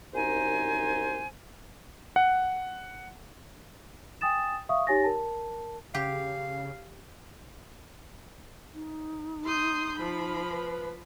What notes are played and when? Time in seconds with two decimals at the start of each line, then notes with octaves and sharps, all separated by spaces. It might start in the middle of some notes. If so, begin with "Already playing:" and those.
0.14 C2 F#2 D#4 C5 G#5
2.16 F#5
4.21 G5 G#5 D#6 A6 E7
4.69 E5 F5 C#6 D#6
4.87 D#4 G4 C#5 G#5 A6 A#6
5.04 A#4 A5
5.94 C#3 G4 F5
8.74 D#4
9.44 C6 D#6 G6
9.96 F3 B5
10.50 B4